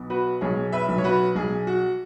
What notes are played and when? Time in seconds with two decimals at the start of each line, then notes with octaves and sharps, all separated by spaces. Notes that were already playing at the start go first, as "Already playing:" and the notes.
Already playing: B1 B3
0.10 F#4 B4
0.41 B1 G#4 C#5
0.72 B4 E5
0.89 B1
0.98 C#5
1.04 F#4 B4
1.36 B1 G#4
1.67 F#4